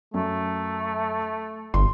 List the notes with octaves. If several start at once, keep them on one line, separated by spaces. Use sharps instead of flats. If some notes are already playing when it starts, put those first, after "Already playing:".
F#2 A3
G1 C6